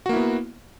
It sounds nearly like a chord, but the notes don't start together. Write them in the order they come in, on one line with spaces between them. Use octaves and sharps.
F#4 A#3 E4 B3